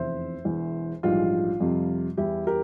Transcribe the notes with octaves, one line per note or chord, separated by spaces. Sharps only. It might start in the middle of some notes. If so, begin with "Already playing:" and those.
Already playing: F1 E2 C3 C5 E5
E1 E2 E3
A#1 G#2 E3 G3 F4
F2 C3 G3
E2 E3 G3 E4 G4
G4 A#4